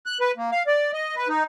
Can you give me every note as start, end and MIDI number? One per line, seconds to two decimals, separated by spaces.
0.06 0.18 90
0.21 0.32 71
0.37 0.51 58
0.52 0.63 77
0.67 0.92 74
0.93 1.15 75
1.16 1.28 71
1.28 1.43 63